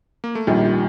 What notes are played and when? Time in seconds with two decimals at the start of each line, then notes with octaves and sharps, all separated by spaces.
0.24 A#3
0.35 A3
0.47 A#1 D#3 G3